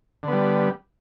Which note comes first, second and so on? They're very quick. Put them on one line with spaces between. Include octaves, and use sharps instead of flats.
D3 B3 G3